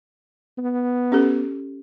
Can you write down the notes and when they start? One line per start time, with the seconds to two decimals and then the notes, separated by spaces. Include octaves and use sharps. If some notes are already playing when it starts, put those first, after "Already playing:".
0.58 B3
1.12 C#4 G4 A4